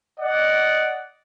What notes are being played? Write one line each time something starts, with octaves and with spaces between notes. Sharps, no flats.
D5 D#5 F#5